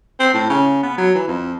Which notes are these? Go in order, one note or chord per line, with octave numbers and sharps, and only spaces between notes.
C4
A2
C#3
B3
F#3
E3
F2